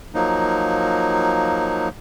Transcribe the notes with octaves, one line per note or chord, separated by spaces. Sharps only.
F3 F#3 A#3 D#4